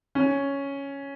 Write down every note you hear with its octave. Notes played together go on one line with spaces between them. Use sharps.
C#4